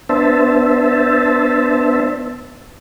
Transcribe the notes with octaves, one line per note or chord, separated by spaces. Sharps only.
B3 D4 C5 E5 A5